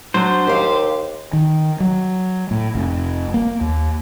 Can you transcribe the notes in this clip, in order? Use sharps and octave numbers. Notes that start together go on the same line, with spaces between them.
F#3 D4 C5
D#2 G4 F5
D#3
F#3
A2
F1
A#3
D#2